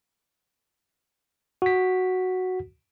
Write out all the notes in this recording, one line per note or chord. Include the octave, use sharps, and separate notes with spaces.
F#4 B6